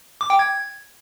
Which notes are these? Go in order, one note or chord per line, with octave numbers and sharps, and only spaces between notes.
D6
G5
G#6